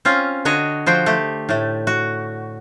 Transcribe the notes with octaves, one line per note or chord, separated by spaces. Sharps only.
C4 C#4 F4
D3 F#4 C#5 D#5
F3 F#4 C5 G5
A3 G4
A2 A3
F#4